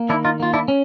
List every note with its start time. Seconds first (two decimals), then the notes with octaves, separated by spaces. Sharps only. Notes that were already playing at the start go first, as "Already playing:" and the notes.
Already playing: A#3
0.09 D#3 D4 E4
0.24 D#4 F4
0.40 A#3 F4
0.54 D4 E4
0.68 C#4